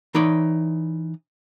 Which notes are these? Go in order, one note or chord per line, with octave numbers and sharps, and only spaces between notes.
E3 D#4 C#5 D5